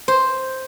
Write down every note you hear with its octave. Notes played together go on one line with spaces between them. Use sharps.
C5